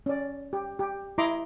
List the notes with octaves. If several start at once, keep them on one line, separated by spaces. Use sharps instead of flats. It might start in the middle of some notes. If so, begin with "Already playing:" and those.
C#4 D5
G4
G4
E4 D#5 A#5 C6 D6